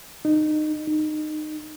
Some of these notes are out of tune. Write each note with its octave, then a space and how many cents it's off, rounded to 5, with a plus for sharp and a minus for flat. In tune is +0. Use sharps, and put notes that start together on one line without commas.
D#4 -25
D#4 -25